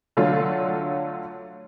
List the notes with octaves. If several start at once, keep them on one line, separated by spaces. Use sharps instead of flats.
D3 F#3 A3 F4